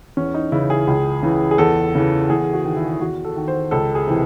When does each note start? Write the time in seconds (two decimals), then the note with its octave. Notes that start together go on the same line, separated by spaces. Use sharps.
0.17 E2 C#4
0.34 D#4
0.52 C#3 E3 E4
0.70 G#4
0.87 C#2
1.23 C#3 E3
1.51 G#4
1.58 E2 A4
1.95 C#3 E3
2.30 E2 G#4
2.53 F#4
2.65 D#3
2.76 E4
3.00 E2 F#4
3.25 A4
3.36 D#3
3.48 C5
3.71 C#2 A4
3.95 G#4
4.07 C3 E3